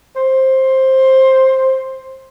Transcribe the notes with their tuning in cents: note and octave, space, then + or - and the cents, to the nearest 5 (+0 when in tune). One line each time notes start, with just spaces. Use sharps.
C5 +10